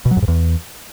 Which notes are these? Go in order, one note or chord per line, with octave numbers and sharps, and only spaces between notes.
B2
F#3
F#2
G#2
E2